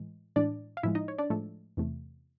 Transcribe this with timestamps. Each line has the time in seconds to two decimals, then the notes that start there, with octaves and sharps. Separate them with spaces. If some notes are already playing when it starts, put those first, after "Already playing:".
Already playing: A2 E3 G#3
0.36 A2 E3 G#3 D4 D5
0.77 F5
0.83 A2 F3 G#3 E4 E5
0.95 D#4 D#5
1.08 C#5
1.19 D4 D5
1.30 A2 F3 G#3 A3 A4
1.77 E2 C3 E3 A3